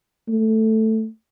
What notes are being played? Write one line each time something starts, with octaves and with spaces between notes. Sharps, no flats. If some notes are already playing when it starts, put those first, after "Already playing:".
A3